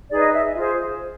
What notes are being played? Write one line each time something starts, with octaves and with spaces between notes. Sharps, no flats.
D#4 G#4 B4 D5
D#5
E5
F4 G#4 C5